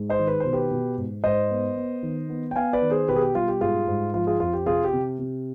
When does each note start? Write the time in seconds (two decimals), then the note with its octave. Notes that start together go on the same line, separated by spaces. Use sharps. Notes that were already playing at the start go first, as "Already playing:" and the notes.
Already playing: G#2 G#3
0.09 C5 D#5
0.19 D#3
0.28 B4
0.40 B2 C5
0.53 G4 B4
0.71 B2
0.98 G#2
1.24 G#2 C5 D#5
1.50 B3
1.76 B3
2.03 D#3
2.29 B3
2.51 G5
2.56 B3 F5 G#5
2.73 B4 D5
2.82 D#3
2.90 G#4 C5
3.08 B2 G4 B4
3.16 G#4
3.21 G4
3.35 G3 F4
3.48 G4
3.61 G#2 F4 G#4
3.87 G#2
4.14 F3 F4
4.27 F4 G#4
4.40 F2 F4
4.53 G4
4.66 C3 F4 G#4
4.84 G4
4.93 C3
5.19 C3